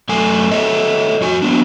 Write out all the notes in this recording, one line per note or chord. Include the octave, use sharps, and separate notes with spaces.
F#2 A3 A4 G#5
A4 C#5 D#5 E5
F2 F#4 G#5
F#3 B3 D4